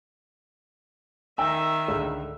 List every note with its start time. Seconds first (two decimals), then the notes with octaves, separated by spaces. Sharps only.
1.38 D#3 E5 G5 E6
1.88 C#2 G#2 D3